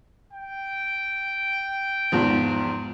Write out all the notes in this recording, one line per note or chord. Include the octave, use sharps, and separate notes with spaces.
G5
E2 G#2 F3